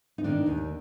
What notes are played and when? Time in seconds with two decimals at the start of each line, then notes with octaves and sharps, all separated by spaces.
0.18 D#4
0.24 D#3 D4
0.46 D#2